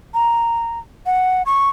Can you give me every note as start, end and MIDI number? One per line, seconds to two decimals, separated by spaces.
0.14 0.79 82
1.06 1.43 78
1.46 1.69 85